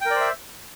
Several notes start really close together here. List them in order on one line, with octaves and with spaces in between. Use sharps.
G5 A#4 D5 C5 E5